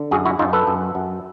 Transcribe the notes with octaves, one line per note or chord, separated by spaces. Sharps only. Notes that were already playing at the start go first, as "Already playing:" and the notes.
Already playing: D3
F#2 F#4 G#4
E4 F#4
F#2 D#4 F4
A4 B4
F#2
F#2